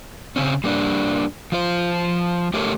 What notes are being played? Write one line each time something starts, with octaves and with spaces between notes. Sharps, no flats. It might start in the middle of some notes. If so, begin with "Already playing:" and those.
C#3 C4 C#4
G3 A#3 D4
F3 F4 C5
A3 G4 A4 A#4 C#5